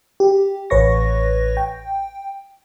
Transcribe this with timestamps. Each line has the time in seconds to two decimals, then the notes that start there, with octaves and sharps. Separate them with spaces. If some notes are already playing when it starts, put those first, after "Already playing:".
0.20 G4
0.70 A1 B4 C#5 C#6 A#6
1.57 G5